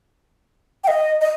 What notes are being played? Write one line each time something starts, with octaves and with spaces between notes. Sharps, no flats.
G5
D#5
D#5